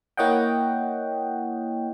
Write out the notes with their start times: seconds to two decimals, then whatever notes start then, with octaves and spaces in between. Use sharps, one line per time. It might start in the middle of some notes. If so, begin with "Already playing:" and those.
0.17 A#3 E4 C#5 D#5 F#5 G5